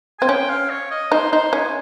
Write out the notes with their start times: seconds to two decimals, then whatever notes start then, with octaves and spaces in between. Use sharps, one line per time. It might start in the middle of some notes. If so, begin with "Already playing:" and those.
0.19 C4 G#5
0.29 C#4 G5
0.49 F5
0.70 C#5
0.91 D#5
1.12 D#4 C5
1.32 D#4 C5
1.53 C#4 G#5